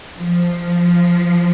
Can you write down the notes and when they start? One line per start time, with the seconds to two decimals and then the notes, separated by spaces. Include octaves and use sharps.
0.19 F3